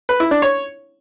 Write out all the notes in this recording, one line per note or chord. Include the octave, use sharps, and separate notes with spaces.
B4
E4
D4
C#5